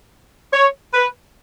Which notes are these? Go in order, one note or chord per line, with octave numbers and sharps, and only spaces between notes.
C#5
B4